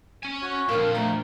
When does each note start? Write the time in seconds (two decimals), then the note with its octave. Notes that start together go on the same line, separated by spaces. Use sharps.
0.23 C#4 G#5
0.42 F#4 C#5
0.69 A#2 D3 F3 C4 A#4 F5
0.94 G3 A3 A#4 C6